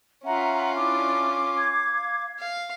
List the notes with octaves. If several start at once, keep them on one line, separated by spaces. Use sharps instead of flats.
C#4 F4 E5 F#5 A#5
D4 E4 D6
F5 G#6
F5